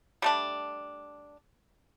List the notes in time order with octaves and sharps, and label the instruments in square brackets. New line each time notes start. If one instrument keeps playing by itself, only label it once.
[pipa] G3 A3 D4